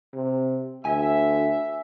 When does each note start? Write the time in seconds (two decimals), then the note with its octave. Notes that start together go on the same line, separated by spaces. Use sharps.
0.14 C3
0.85 D2 E5 G#5